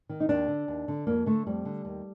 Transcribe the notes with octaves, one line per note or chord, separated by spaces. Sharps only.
D#3
D#4
D#2 D4
D3
D#2
D3
F2 A#3
D3 A3
F2 G3
D3
D#2